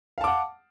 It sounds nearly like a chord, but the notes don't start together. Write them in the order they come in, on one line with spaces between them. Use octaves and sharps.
F5 A5 D6 F#5